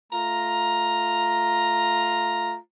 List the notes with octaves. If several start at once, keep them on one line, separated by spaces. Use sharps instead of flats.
A3 F4 A#5